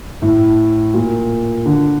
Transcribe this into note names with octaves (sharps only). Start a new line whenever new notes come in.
A2
A#2
D3